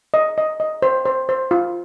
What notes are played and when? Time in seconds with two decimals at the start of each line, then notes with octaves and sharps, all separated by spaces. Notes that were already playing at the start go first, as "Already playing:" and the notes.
0.14 D#5
0.38 D#5
0.60 D#5
0.82 C5
1.05 C5
1.29 C5
1.51 F4